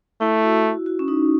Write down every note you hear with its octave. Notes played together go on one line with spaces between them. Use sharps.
A3 E4
F#4
F#4
F#4
C#4
D#4